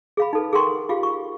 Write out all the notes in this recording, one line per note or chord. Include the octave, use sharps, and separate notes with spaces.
G#4 F5 B5
D#4 A4 B4
G#4 A#4 F#5 G5 C6 C#6
F4 G4 G#4 F5
C#6